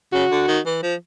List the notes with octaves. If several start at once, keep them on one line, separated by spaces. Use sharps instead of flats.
C#3 F#4
D3
D#3
E3
F3